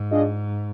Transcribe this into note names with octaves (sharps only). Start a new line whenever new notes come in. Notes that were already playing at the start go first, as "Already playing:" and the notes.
Already playing: G#2
D4 F4 G#4 D#5